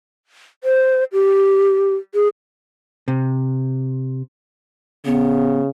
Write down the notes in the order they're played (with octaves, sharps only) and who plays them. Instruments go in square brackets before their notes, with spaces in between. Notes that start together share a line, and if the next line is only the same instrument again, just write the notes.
[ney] C5
G4
G#4
[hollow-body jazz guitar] C3
[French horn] C#3 [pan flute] B3